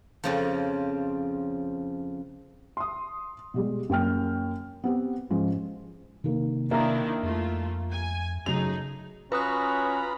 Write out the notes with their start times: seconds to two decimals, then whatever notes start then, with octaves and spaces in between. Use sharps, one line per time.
0.24 F2 C#3 F3
2.77 C6 D#6
3.54 B2 G3 G#3
3.89 F#2 A#3 G5 F6
4.84 B3 C4 G4
5.31 G#2 F3 C#4
6.24 C3 D#3 A#3 A#4
6.71 D#3 A#3 D4 E4 A#4 E5
7.23 F2 A3 F4
7.91 G#5
8.46 F#2 C#3 A3 D#4 G#4 F7
9.32 C#4 F4 F#4 B4 A#5 B5 D#6 F#6